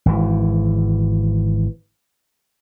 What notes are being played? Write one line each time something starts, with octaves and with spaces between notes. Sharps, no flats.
G#1 E3